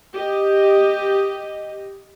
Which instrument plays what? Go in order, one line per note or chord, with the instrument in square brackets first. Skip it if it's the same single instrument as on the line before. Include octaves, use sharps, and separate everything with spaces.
[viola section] G4 D#5